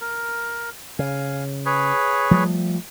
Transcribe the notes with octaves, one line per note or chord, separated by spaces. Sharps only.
A#4
C#3 F5 G#5
G#4 B4 C#5
F3 G3 A3